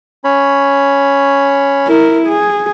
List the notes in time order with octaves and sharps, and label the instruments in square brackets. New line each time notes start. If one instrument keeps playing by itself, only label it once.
[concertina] C#4 C#5 B5
[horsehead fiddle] E4 A#4
G#4